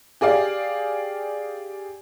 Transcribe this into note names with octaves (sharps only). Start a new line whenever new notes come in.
G4 G#4 D5 F5